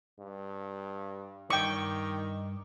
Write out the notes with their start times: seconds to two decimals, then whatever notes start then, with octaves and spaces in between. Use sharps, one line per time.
0.19 G2
1.50 G2 D#3 D5 G5 C#6